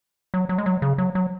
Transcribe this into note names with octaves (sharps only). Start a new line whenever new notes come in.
F#3
F#3
G#3
F#3
C#3
F#3
F#3